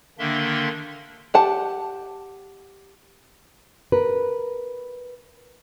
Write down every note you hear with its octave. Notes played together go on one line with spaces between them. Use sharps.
D3 D#3 A#3 D4 E5 C6
G4 F#5 A5
A#4 B4